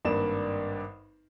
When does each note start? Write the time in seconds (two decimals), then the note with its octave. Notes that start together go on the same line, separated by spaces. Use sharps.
0.05 G#1 G2 A#3 D5 E7